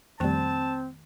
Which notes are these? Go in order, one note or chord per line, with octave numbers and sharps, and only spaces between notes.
F2 B2 D#3 G3 A3 C4 G5 A5